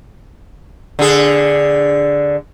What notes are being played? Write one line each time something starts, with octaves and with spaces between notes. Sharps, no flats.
D3 G#4